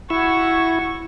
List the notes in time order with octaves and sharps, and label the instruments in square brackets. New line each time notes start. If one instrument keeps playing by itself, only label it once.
[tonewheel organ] E4 [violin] F#4 C#6